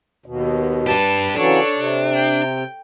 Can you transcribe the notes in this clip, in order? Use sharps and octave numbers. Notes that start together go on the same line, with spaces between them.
D#2 B2
D4 G4 B4 A5
C#3 E3 F#3 D4 A4 C#5
C3
G5